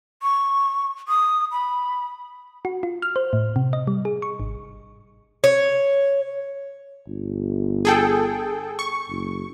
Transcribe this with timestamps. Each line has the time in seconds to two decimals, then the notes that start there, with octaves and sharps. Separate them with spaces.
0.23 C#6
1.08 D#6
1.52 B5
2.65 F#4
2.83 F4
3.02 F6
3.16 C5
3.33 A2
3.56 C3
3.73 D#5
3.87 G3
4.05 G#4
4.22 C#6
4.40 G#1
5.44 C#5
7.08 G1
7.85 G#4 A4 G5
8.79 C#6
9.09 F#1